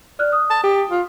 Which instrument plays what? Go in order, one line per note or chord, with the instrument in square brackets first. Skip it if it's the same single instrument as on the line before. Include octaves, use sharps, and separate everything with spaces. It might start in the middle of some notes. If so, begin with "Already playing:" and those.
[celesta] D5 F6 F#6
D#6
[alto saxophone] A5
G4
F4